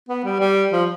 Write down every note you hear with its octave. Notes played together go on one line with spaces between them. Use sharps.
B3
G3
G3
F3